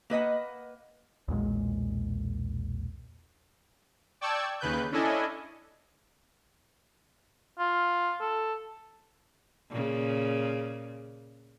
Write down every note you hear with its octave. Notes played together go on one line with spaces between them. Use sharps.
A#3 B4 D#5 F#5
B1 E2 A#2 G#3
D5 G5 A5 C#6 E6 G#6
D#2 C#3 B4 F#6 G6
C#4 D4 E4 A4 D#5 G#5
F4
A4
A#2 C#3